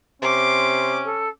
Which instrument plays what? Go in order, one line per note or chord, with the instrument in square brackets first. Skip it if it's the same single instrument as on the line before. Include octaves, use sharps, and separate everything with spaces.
[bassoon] C3 [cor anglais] C#4 [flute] C6 [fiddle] D6
[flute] A4